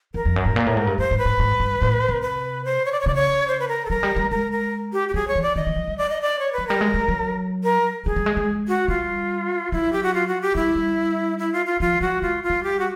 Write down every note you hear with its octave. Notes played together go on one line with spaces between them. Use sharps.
E2 A#4
F2
F#2
G#2
A#2
A2
G#2
G2
F#2 C5
G#2
B4
G#2
G#2
G2
A2
C3
B4
C5
C#5
D5
C#5
C#3 D5
C#5
C5
B4
A#4
A4
F#3 A#4
G3
G3
G#3 A#4
A#4
G4
G4
F#3 G#4
C#5
E3
D5
D#3 D#5
E3
F3
G3
D5
D#5
D5
C#5
B4
F#3
G3 A#4
G#3
G3
F#3
A#4
G3 G#4
G3
G#3
G#3
F#4
G3 F4
F#3 E4
G4
F#4
F4
F#4
G4
G3 E4
G3
E4
F4
F4
F3 F4
F#3 F#4
G#3 F4
F4
G3
G4
F#4